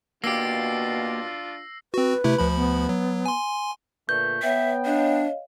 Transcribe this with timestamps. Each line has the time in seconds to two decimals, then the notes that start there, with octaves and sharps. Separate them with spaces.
0.24 B2 A#3 D4 F4 G4 E6 A#6 C7
1.94 C4 F#4 B4
2.24 C3 A3 E4
2.38 D2 F3 B5
2.56 B3
2.89 F#3
3.26 G#5 C6
4.09 A#2 D3 A3 B4 G6
4.43 B3 B4 C#5 E5 G5
4.85 D4 C#5 D#5 F5